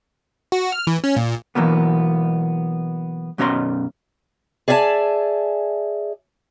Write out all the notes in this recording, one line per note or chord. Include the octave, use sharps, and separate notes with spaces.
F#4
F6
E3
C#4
A#2
B2 E3 F#3 A#3 B3
F#2 B2 C#4 C#5 A#5 C6
G#4 D5 E5 F5 G#5 A5